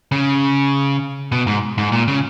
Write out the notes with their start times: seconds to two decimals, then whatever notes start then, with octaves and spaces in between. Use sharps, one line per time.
0.12 C#3
1.32 B2
1.47 G#2
1.78 G#2
1.92 A#2
2.08 C#3